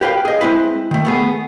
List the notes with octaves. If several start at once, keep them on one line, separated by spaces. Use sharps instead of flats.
G4 B4 F5 G5
G#4 D#5
G#3 C4 E4 B4
D#3 A3
A3 B3 G#4